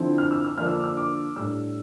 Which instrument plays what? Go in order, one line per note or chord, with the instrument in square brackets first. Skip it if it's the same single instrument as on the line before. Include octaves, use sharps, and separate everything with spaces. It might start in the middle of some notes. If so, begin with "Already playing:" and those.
Already playing: [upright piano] D3 F3 C4 E4
F6
E6
E6
D3 F3 A#3 D4 F6
E6
D6
E6
D6
A2 G3 D4 E6